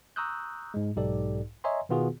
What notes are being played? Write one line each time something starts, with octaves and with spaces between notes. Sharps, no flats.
A#5 C#6 D#6 E6 F#6 G6
G#2 G#3
B1 G#2 D#4 G4 A4 D5
C#5 D#5 E5 G#5 A#5 C6
B2 D#3 B3 F4 F#4 G#4